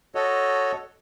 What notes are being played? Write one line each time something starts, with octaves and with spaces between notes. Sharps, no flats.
F#4 A4 C#5 D#5